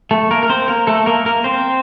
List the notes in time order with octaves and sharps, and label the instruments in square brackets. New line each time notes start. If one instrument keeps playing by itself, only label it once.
[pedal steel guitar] A3 A4
A#3 A#4
A#4
C4 C5
A#3 A#4
A3 A4
A#3 A#4
A#3 A#4
C4 C5